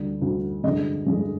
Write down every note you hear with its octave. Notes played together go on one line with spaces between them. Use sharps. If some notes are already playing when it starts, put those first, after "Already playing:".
Already playing: D2 D3 G3
D2 D3 G3
G2 D3 G#3 D#5
G2 D3 G#3